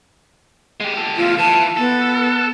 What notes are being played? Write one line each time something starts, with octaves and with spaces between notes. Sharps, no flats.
G#3 G4
G4 A4
E2 A2 F4
E3 A5
B3 A4